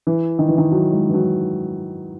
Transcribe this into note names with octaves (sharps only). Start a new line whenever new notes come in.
E3
D#3
E3
D#3
F#3
G#3
E3
F#3